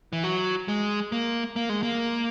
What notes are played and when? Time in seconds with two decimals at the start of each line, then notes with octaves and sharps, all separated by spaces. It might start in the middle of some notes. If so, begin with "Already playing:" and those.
0.13 E3
0.24 F#3
0.68 G#3
1.12 A#3
1.56 A#3
1.69 G#3
1.83 A#3